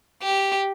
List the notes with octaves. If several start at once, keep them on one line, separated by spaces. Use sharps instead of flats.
G4